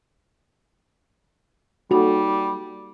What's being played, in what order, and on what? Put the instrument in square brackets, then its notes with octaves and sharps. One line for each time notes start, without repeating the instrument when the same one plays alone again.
[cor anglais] G3 [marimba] A#3 D#4 A4 [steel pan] F#4